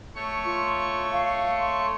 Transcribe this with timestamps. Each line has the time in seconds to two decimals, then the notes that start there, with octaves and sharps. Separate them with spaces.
0.15 A3 C#5 C#6
0.45 F4
1.12 F5
1.59 C6